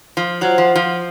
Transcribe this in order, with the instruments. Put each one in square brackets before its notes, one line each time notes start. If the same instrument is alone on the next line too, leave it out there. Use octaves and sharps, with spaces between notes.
[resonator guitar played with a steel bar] F3
[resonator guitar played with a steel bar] F#3 [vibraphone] F4 C5 F#5
[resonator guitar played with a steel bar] F3
F3